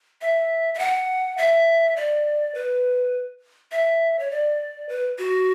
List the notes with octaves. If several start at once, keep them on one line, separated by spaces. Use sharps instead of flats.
E5
E5
F#5
E5
D5
B4
E5
C#5
D5
B4
F#4